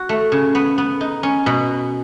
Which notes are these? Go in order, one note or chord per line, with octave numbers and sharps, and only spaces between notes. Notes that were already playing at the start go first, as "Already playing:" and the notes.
Already playing: F#4
A3
C#3
B3
B3
D#4
C#4
B2